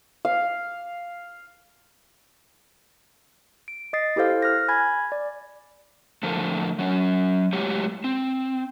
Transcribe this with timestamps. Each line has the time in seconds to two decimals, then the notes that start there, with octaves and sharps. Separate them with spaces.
0.25 F5
3.68 D7
3.93 D#5 D#6 A6 C7
4.16 E4 G4 A4 C5 F5
4.42 F6 F#6 A#6
4.68 G#5 B5 G#6
5.12 D5
6.23 A2 D3 F3 A4 A#4 C5
6.79 F#3 C#4
7.53 A2 F#3 G#3 G4 C#5
8.04 C4